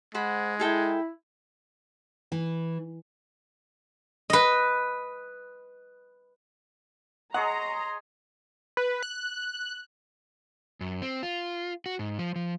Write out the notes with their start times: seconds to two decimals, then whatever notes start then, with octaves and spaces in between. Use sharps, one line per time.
0.15 G#3 C5 F#5 B5
0.60 E4 G#4 A4 G5
2.32 E3
4.30 B4 D#5
7.34 G#4 C#5 D#5 F#5 A#5 C6
8.77 B4
9.03 F#6
10.81 F#2
11.02 C4
11.23 F4
11.86 F#4
11.99 G#2
12.19 F3
12.36 F3